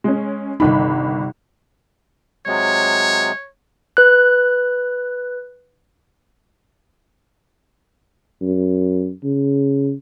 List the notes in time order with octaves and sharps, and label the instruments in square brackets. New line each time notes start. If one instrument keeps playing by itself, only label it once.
[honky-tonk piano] G#3 C#4
[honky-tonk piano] G1 D#3 B5 [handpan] C3 D#4
[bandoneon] C3 F#3 G#3 [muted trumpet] C#5
[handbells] B4 F#6
[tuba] F#2
C#3